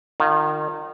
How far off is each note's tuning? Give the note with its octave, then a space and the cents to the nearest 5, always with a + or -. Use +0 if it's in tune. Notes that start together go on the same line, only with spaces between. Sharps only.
D#3 -30 F4 +10